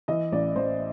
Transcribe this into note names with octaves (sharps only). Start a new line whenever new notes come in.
E3 D#5
A1 D5
A1 C5